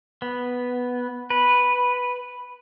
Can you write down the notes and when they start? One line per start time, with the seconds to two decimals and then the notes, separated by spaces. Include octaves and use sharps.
0.22 B3
1.30 B4